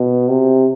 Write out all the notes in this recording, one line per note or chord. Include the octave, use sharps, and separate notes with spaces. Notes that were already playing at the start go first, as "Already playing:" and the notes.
Already playing: B2
C3